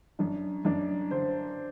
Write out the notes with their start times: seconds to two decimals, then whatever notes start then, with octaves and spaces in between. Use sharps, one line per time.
0.19 F#2 D4
0.65 F#2 D4
1.11 D3 C5